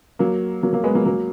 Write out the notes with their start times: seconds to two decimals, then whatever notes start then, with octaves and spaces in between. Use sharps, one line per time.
0.19 F#3 A#3
0.63 F#3 A#3
0.73 F#3 A#3
0.84 G#3 B3
0.95 F#3 A#3
1.06 F#3 A#3